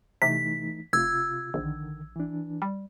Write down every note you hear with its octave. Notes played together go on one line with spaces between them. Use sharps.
C3 E3 A3 D#4 B6
F1 C3 F4 E6 G#6
A#1 D3 D#3
E3 D4
G3